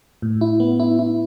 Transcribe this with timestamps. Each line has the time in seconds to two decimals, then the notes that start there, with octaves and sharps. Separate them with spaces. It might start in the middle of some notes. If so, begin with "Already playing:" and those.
0.22 A2
0.41 E4
0.60 B3
0.80 E4
0.99 E4